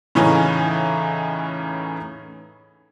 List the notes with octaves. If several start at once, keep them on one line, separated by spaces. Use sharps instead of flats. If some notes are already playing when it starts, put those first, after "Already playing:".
A2 C#3 E3 C#4 D#4